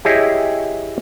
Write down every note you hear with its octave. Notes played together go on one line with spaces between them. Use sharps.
E4 G4 G#4 C#5 D#5 E5